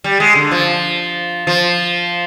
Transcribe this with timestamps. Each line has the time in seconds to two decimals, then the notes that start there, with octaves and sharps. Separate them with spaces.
0.04 G3
0.20 G#3
0.35 D3
0.51 F3
1.47 F3